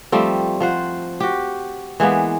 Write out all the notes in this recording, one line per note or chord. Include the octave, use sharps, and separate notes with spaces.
F3 G3 A3 C4
F3 C5 F#5
F#4 G4
E3 G#3 A#3 B3